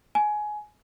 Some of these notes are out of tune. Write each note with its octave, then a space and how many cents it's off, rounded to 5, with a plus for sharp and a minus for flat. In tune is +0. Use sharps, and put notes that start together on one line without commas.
G#5 +20